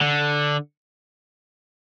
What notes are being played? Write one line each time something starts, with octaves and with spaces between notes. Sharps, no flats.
D3